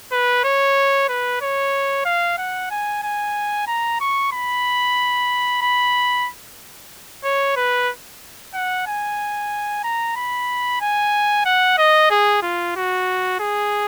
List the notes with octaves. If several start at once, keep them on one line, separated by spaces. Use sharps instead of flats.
B4
C#5
B4
C#5
F5
F#5
G#5
G#5
A#5
C#6
B5
B5
C#5
B4
F#5
G#5
A#5
B5
G#5
F#5
D#5
G#4
F4
F#4
G#4